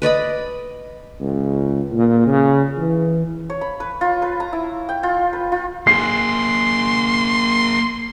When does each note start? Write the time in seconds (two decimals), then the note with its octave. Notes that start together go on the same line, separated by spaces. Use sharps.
0.02 B4 D5 D#5 B5
1.20 C#2
1.92 A#2
2.27 C#3
2.77 E3
3.50 C#5
3.61 B5
3.80 B4
4.01 F4
4.22 B4
4.40 A#5
4.53 E4
4.89 G5
5.03 F4
5.33 B4
5.52 F4
5.87 A#3 G#4 C6 C7